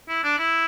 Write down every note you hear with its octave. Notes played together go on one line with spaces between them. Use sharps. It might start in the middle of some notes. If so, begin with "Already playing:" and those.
E4
D4
E4